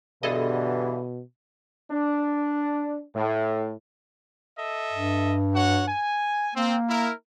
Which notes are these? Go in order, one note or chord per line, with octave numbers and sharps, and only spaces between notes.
G2 B2 D3 E3 G#4 A4 D#5
D4
A2
A4 D#5 E5
G2
F#4 C#5 F#5
G#5
A#3 C4
E4 A#4